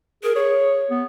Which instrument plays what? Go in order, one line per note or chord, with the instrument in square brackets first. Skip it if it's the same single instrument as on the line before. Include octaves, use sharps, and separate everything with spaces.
[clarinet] G#4 [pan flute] A#4
[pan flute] G#4 [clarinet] C#5
[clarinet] B3